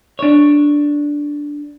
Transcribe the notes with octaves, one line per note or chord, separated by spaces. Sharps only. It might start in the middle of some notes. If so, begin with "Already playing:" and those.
D4 C#5